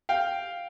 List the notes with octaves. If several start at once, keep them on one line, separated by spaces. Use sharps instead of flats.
F5 G5